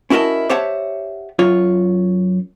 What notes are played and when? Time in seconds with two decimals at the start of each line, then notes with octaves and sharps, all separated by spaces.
0.10 C#4 E4 F#4 A#4 D#5 A5
0.49 G4 C5 C#5 E5 F#5 A5
1.39 F#2 F4 C#5